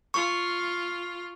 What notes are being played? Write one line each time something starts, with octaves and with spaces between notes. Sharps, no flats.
F4 C#6